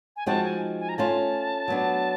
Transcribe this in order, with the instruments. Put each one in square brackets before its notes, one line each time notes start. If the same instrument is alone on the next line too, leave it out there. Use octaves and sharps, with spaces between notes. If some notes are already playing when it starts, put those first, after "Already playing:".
[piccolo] G#5
[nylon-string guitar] F3 G#3 C4 D#4 F#4 [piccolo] A5
[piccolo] G#5
G#5
A#5
[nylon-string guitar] A3 C#4 F4 [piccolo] A5
[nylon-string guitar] F#3 B3 D4